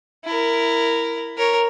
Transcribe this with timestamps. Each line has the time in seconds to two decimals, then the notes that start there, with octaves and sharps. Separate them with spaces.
0.25 E4 A#4
1.38 A#4 C#5